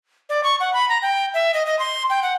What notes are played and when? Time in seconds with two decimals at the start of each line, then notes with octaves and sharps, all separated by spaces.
0.29 D5
0.44 C#6
0.60 F#5
0.74 B5
0.89 A#5
1.02 G5
1.34 E5
1.54 D#5
1.66 D#5
1.79 C6
2.10 G5
2.23 F#5